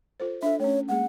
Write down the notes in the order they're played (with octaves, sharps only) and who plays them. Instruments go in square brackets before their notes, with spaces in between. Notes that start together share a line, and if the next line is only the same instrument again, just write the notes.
[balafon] F4 A4 C5
[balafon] D4 A4 [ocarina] E5
[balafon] A3 C#4 [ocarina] C#5
[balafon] G#3 A#3 G#4 [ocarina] F#5